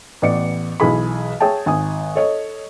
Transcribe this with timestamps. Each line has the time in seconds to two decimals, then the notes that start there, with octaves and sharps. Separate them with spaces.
0.22 A1 B3 D5 C#7
0.80 B1 E3 G#4 B5
1.40 G#4 C#5 E5 G5 A5
1.66 G#1 G#5 D#6
2.15 A4 C#5 D#5